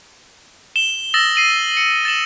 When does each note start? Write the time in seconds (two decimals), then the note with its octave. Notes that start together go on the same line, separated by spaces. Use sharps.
0.76 E7 G7
1.14 D#6 E6 A6 A#6 E7 F#7
1.36 C7 D#7 F#7
1.77 C#7
2.05 A6 D#7 E7 F#7